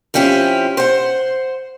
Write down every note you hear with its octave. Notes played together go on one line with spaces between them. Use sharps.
F3 C4 C#4 E4 G4
C5 F#5